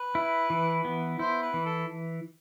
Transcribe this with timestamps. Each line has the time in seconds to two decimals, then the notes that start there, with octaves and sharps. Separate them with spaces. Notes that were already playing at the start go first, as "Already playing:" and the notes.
Already playing: B4
0.15 E4
0.50 E3
0.85 B3
1.19 E4 C5
1.42 B4
1.54 E3
1.66 A4